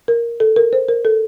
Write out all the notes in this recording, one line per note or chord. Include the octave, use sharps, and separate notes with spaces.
A#4
A4
A#4
C5
A#4
A4